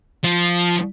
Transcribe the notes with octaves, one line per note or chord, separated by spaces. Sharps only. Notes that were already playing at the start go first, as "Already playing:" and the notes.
F3